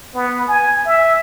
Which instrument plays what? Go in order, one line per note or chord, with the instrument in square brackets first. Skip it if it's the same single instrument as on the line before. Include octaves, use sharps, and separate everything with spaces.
[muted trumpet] B3
G#5
E5